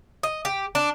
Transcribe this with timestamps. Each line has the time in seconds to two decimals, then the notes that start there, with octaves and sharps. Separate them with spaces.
0.23 D#5
0.45 G4
0.75 D4